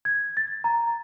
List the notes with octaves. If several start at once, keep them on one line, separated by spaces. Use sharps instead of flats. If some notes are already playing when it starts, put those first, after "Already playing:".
G#6
A6
A#5